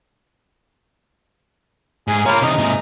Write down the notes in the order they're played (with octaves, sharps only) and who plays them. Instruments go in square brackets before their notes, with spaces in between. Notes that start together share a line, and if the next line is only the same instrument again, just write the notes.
[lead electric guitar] G#2 [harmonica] G#4
[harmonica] A#3 F4 [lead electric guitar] C#5 B5
[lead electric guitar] C3 D#3 [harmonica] D#4
[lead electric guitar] G#2 C3